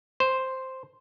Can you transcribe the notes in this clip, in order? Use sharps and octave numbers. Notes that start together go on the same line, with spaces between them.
C5